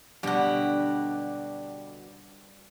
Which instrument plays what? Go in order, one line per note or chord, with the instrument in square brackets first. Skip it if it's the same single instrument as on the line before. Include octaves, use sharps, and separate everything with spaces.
[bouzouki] B2 D3 [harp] G3 D4 [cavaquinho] G4 F#5